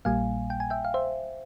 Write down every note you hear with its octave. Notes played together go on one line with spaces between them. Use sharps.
A#1 A#2 G3 A#3 F5 G#5
G5
G#5
E5 G5
F5
C5 E5